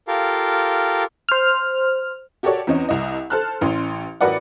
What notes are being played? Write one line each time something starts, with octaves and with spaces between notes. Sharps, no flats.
F4 G4 A4 A#4 F5
C5 F6
F#4 G4 A4 A#4 C#5 D5
E2 C4 C#4 D#5
C2 D#5
A4 C5 A5 F6 F#6
A1 C#4 C6
A1 F#4 A#4 B4 D5 F#5